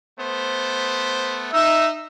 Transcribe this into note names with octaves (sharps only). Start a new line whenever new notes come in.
A3 B3 C5
D#4 E5